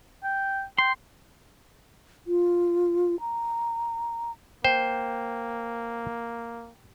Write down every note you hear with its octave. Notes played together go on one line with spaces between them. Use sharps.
G5
G5 C6
F4
A#5
A#3 C5 G5